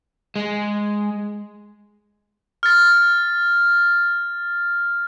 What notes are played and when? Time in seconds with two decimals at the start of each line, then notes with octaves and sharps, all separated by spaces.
0.36 G#3
2.63 F6 A6